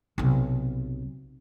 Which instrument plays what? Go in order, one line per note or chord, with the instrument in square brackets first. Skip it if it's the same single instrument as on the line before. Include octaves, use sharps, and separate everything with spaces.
[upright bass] B1 C3